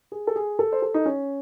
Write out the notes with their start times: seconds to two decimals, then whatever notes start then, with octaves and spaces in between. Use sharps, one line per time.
0.12 G#4
0.27 A4
0.36 G#4
0.59 A4
0.72 C5
0.82 A4
0.94 D#4
1.06 C#4